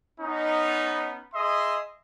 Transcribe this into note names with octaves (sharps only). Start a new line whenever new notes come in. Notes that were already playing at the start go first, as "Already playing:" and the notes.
B3 C#4 D#4
G#4 D#5 E5 C6 D#6